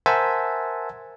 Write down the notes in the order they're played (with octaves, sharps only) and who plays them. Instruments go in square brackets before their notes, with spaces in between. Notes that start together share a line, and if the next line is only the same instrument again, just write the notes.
[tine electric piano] A#4 C5 E5 F#5 G#5 A5